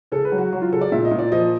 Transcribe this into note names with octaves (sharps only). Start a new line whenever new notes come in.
C#3 A4
B4
F#3
F#4
F#3 F#4
F4
C#3 A4
D5
A#2 E5
D#5
A#2
D5
F3 D#5